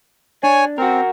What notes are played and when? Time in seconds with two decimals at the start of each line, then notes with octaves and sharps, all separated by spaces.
0.43 D4 C#5 G#5
0.78 C4 F#4 A#4